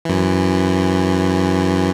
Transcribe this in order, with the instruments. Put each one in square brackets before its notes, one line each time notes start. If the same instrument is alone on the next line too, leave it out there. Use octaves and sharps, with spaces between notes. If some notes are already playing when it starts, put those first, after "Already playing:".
[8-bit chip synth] F#2 E3